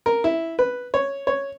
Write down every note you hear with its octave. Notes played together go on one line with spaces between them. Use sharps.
A#4
E4
B4
C#5
C#5